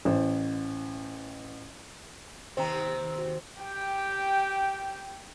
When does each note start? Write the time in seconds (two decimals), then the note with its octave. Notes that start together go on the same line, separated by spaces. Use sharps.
0.05 A1 C5
2.57 D#2 C3 C4 C5 A#5
3.19 F#4
3.61 G4 G5